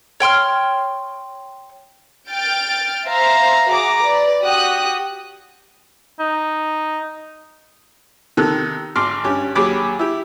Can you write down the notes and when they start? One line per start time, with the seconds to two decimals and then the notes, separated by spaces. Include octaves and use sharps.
0.20 C#5 G5 C6 F6
2.28 G5 F6 G6 A6 D7
3.07 C5 E5 F5 A#5
3.72 F#4 G#4 A#5 D6
4.03 B4 D5
4.42 F#4 G4 D#6 F#6
6.20 D#4
8.37 C3 D#3 A4 F#6
8.96 G#1 C6 D6 F6
9.24 G2 C#4 G4
9.55 D#2 F#3 G4 G#4 B5 D6
9.99 E4 G4